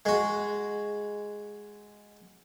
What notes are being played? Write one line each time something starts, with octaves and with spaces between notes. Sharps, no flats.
G#3 F#4